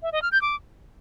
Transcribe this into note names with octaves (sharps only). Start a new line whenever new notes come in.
E5
D#5
F6
G6
D6